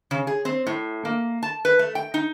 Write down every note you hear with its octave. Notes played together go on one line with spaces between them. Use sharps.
C#3
G#4
C4
A2
A#3
A5
B4
A3
G5
D#4